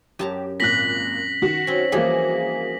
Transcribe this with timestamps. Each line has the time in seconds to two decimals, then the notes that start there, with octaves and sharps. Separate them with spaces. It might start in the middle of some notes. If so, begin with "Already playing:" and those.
0.19 F#2 G4 A5 A#5
0.60 G#1 A#2 F#6 A#6 B6 F#7
1.42 D#3 F#4
1.67 C4 C#4
1.92 E3 F3 G3 A#3 F#4 G#4